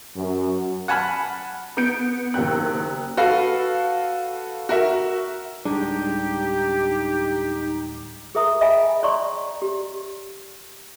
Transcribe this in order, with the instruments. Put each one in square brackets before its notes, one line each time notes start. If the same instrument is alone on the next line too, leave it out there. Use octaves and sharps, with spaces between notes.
[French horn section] F#2
[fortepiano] F#5 G#5 A5 B5 F6
[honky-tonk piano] B3 G6 C#7 D7
F#1 D#2 G5 F#6
[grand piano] F#4 A4 B4 F5
F#4 A#4 E5
[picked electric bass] D1 G3 G#3 [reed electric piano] D4 [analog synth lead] D#4 [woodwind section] G4
[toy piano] G#4 A#4 E5 A#5 D#6
D#5 E5 G5 G#5 B5
C#5 D5 A#5 C6 C#6
G4